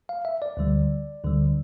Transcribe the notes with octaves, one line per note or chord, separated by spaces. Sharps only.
F5
E5
D5
D2 D3 G3
D2 D3 G3